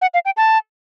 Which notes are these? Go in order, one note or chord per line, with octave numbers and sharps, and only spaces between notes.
F#5
F5
G5
A5